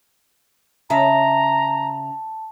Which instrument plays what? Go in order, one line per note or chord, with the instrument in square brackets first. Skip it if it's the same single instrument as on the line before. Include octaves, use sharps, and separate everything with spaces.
[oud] C#3 D#5 E5 [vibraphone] A5 [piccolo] A#5